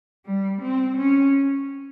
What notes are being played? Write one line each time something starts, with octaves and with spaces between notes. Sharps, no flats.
G3
C4
C#4